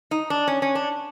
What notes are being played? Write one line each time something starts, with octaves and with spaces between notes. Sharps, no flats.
D#4
D4
C#4
C#4
D4